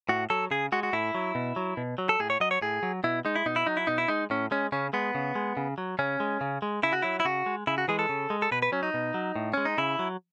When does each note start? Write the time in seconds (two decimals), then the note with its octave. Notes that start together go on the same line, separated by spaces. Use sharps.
0.09 A2 F#4
0.30 F#3 A4
0.51 C#3 G#4
0.72 G#3 F#4
0.83 F#4
0.93 A2 E4
1.15 F#3
1.35 B2
1.56 F#3
1.77 B2
1.98 F#3
2.09 A4
2.20 A2 G#4
2.30 C#5
2.40 F#3 D#5
2.51 C#5
2.62 A2 G#4
2.83 F#3
3.04 B2 E4
3.25 G#3 D#4
3.36 E4
3.46 B2 D#4
3.56 E4
3.67 F#3 D#4
3.77 E4
3.87 B2 D#4
3.98 E4
4.08 G#3 D#4
4.30 A2 C#4
4.51 G#3 C#4
4.72 C#3 C#4
4.93 G#3 B3
5.15 C#3
5.35 G#3
5.57 C#3
5.78 F#3
5.99 C#3 C#4
6.20 G#3
6.41 C#3
6.62 G#3
6.83 C#3 E4
6.93 F#4
7.02 F#3 E4
7.20 E4
7.25 C#3 F#4
7.46 G#3
7.67 C#3 E4
7.78 F#4
7.88 E3 G#3 G#4
7.99 A4
8.09 C#3
8.30 G#3
8.42 A4
8.51 B2 B4
8.62 B4
8.72 F#3 C#4
8.83 D#4
8.94 B2
9.14 F#3
9.36 A2
9.54 G#3 C#4
9.65 D#4
9.78 C#3 E4
9.99 F#3